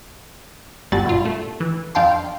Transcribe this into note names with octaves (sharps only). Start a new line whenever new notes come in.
G1 D3 G3 F#4 A6
F#2 A#2 F4
A3
E3
F2 D4 F5 G5 A5 C6